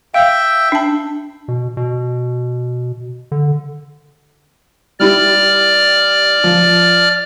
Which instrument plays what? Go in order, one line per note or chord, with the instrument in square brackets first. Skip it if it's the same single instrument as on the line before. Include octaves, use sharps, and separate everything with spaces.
[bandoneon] E5 G5 [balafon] F5
[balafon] D4 A5
[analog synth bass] B2
B2
D3
[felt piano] G3 E4 G4 [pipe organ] D5 F6
[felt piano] F3